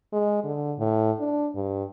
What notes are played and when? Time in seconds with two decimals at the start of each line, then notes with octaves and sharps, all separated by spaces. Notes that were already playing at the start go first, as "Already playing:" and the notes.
0.13 G#3
0.44 D3
0.79 A2
1.20 D4
1.55 G2